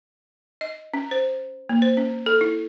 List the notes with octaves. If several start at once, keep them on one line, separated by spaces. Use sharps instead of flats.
D#5
C#4
C5
A#3
C5
C#4
A4
E4